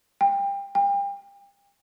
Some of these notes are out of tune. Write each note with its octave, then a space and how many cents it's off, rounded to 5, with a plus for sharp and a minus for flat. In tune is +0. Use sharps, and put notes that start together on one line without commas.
G5 +25
G5 +35